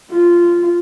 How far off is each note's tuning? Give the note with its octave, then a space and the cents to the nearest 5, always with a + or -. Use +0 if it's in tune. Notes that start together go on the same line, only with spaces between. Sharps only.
F4 -10